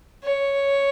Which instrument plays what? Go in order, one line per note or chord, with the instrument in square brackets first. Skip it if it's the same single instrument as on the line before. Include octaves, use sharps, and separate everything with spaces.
[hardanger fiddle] C#5